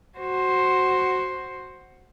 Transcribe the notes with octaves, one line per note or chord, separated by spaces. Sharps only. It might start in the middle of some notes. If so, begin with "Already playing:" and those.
F#4 C5